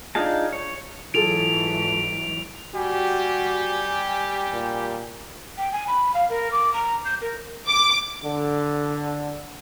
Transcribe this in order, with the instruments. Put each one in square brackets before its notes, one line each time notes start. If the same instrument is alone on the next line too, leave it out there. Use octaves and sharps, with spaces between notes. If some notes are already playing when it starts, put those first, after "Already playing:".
[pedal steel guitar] D4 D#4 F4 G#4 A5
C#5
[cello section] G#2 E3 F#3 [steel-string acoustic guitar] F4 G#4 A4 [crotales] D7 F7
[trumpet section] G3 G4 [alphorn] F#4 [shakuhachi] G#5
[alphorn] A#2
[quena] G5
G#5
B5
F5
A#4
D6
A#5
G6
A#4
[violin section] D6
[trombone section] D3